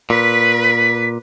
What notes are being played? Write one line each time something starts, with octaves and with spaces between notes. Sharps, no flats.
A#2 B4 B6